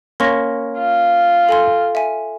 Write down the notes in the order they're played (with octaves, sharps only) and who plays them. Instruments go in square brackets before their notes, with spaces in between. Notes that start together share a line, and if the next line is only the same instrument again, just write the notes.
[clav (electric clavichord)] A#3 C#4 [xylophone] C6 C#6 A#6
[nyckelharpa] F4
[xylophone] A4 G#5 C6
E5 G#5